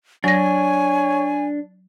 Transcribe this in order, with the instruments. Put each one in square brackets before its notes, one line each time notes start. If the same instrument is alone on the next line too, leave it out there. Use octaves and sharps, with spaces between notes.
[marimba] F#3 A#6 [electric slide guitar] D4 [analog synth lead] C#5 [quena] G#5